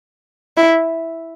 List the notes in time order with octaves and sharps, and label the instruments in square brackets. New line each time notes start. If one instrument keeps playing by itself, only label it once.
[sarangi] E4